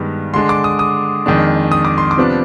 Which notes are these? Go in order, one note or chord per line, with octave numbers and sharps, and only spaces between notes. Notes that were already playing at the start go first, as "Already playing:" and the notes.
Already playing: G2 D#3 G#3 B3
D3 G#3 D4 C6
D6
D#6
D#6
F2 D#3 G#3 D4
D#6
D6
C6
D6
C3 F3 B3 D4